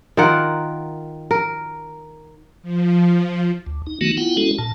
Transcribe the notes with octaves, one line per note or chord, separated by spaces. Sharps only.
D#3 F4 A#4 F#5
A#4
F3
D2
D#4
D#3 F#3 A3 B3 D#4 F#4
B3 E4 F4 F#5 G5
G#3 C#4 E4 F#4 A4
A#2 A5